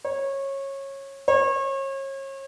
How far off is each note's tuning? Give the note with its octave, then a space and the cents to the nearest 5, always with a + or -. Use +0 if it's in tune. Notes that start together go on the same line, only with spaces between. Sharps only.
C#5 -20
C#5 -35